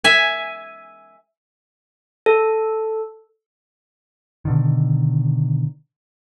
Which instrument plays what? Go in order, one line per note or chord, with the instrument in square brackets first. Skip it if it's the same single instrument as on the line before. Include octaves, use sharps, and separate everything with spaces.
[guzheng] E5 G#5
[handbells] A4
[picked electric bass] B2 D3 D#3